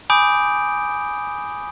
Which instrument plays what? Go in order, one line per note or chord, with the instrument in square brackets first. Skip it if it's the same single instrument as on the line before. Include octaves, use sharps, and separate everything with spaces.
[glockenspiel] G#5 B5 D6 D#6 G6 D7